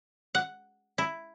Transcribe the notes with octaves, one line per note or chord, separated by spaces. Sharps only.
F#5
E4